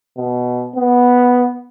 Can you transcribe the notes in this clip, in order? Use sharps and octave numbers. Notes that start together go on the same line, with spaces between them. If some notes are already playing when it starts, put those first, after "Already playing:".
B2
B3